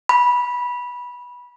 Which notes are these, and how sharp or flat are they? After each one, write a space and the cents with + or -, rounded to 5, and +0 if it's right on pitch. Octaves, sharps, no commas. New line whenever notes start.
B5 -15